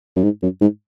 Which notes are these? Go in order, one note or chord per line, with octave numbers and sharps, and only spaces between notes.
F#2
G#2
F#2
G#2